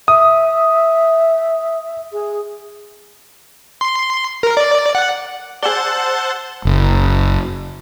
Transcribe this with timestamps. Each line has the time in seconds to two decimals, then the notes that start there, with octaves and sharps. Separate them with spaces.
0.08 E5 D#6
2.13 G#4
3.81 C6
4.43 A#4
4.57 D5
4.95 F#5
5.63 G#4 C5 D5 F#5 A5 E6 G7
6.65 F#1